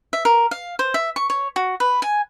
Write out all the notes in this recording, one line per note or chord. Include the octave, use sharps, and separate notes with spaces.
E5
A#4
F5
C5
E5
C#6
C#5
F#4
B4
G#5